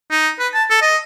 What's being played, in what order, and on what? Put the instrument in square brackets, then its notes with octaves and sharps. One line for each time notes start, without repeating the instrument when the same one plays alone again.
[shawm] D#4
B4
A5
A4
D#5